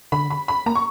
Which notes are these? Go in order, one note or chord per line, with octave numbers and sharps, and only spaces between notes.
D3 B5
B5
B5
A#3 A#5
C#6